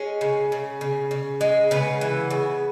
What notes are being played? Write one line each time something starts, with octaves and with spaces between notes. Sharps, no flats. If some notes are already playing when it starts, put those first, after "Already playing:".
Already playing: G#3 C#4
C#3
C#3
C#3
C#3
G#3
C#3 B3
E3
C#3